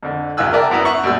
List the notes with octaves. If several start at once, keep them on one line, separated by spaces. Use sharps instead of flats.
F2 D3
C#2 F#2 F4 G#5 E6 F#6
A#4 D5 E5 G5 A5
F#2 B3 E4 A#5 D#6
E5 F#5 C#6
F#2 A#2 G3 E6